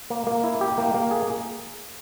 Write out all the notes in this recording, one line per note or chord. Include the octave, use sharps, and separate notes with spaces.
A#3
A#3
E4
G4
A#3
A#3
G#4